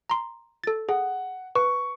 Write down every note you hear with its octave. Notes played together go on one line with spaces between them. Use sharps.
A#5 C6
A4 A6
G#4 F#5
B4 C#6